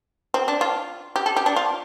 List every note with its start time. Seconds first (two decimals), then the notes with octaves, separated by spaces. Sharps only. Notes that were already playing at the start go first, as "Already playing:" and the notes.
0.34 C4
0.48 D4
0.61 F4
1.16 G4
1.26 A4
1.36 G4
1.46 D4
1.56 F4